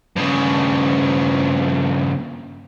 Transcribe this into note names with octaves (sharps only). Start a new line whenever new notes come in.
G2 C#3